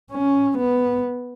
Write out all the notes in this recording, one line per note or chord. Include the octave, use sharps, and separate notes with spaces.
C#4
B3